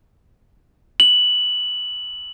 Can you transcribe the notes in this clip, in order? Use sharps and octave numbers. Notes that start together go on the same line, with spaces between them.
F#7